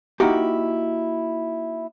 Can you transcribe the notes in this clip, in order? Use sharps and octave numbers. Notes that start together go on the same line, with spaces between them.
A#3 D#4 E4 F#4 G4